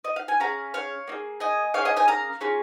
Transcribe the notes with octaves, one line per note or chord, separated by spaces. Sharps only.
D#5
F5
G#5
C#4 G#4 F5 A#5
C#5 F5
A#3 D#4 G#4
D#5 G#5
A#3 C#4 G#4 C#5 F5
D#5 G#5
D#5 G#5
F5 A#5
C#4 F4 G#4